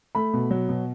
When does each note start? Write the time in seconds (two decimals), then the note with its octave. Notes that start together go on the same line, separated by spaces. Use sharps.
0.15 A3 B5
0.33 B2
0.50 F#3
0.69 B2